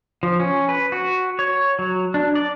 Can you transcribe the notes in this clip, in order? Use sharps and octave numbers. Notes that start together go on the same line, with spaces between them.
F3
C#4
B4
F#4
C#5
F#3
D4
D5